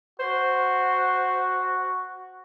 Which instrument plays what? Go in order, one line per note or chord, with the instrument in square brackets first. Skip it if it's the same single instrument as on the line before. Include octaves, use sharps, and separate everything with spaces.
[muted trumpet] F#4 [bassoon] C5